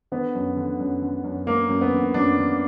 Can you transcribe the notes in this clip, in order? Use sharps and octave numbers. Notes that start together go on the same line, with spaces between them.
D3 B3
F#2
D3
F#2
D3
F#2
D3 A#3
F#2
B3
D3
F#2 D4
D3